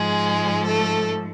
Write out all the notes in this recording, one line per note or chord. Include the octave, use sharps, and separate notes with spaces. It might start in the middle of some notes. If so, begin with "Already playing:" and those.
Already playing: G#2 F3 G#3 G#4
A3 A4